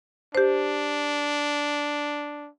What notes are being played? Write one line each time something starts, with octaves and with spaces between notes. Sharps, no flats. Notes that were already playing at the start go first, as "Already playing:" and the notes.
D4 G4 C5